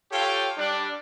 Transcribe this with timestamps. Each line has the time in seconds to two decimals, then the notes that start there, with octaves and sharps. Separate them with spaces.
0.12 F4 G4 A4 C#5 F5 G5
0.58 G3 D4